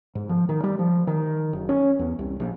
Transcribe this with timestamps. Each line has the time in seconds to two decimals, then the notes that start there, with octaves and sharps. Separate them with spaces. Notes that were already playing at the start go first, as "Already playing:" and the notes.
0.15 G#2
0.29 F3
0.49 D#3
0.64 G3
0.79 F3
1.07 D#3
1.53 F#1
1.69 C#4
1.99 E2
2.19 C2
2.40 A#1